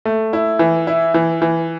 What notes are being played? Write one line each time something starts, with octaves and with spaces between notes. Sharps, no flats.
A3
E4
E3
E4
E3
E3